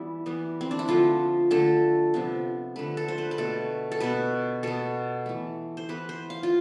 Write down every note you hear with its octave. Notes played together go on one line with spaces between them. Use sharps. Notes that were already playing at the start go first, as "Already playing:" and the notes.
Already playing: E3 G3 B3 E4
E3 G3 B3
C4
D4
E4
D3 F3 A3 F4
D3 A3 A4
C3 F3 B3
D3 A3 B4
A4
C5
B4
B4
B2 A3 A4
A4
B2 B3 B4
B2 B3 A4
E3 A3
C5
E3 B3 B4
C5
F5
F4